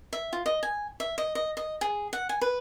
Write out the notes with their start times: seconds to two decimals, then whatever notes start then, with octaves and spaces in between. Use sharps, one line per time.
0.13 E5
0.33 F4
0.46 D#5
0.63 G#5
1.00 E5
1.18 D#5
1.35 D#5
1.57 D#5
1.81 G#4
2.13 F#5
2.29 G#5
2.41 B4